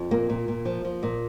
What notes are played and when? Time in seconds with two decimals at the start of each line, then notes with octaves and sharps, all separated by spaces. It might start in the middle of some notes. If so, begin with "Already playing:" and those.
Already playing: F2
0.11 A#2 A#3
0.30 A#2
0.48 A#2
0.65 F3
0.85 F3
1.03 A#2